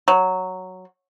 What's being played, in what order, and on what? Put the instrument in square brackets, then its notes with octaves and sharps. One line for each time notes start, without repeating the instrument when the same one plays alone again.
[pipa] F#3